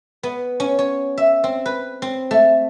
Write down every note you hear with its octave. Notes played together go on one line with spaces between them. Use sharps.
B3
C#4
C#5
E5
C4
B4
C4
A3